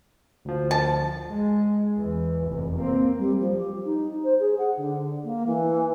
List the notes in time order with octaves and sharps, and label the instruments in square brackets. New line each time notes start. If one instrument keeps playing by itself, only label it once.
[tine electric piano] D2 F3
[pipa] A5
[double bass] G#3
E2 E3
F1 E2
A#3 C4
[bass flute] G3
F3
G4
D#4
C5
G#4
F#5
D3
A#3
E3